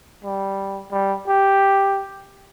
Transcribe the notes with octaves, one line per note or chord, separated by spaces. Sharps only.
G3
G3
G4